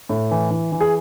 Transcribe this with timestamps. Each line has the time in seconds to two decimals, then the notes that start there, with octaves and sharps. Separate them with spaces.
0.09 A2
0.31 E3
0.51 E3
0.72 E3
0.81 G#4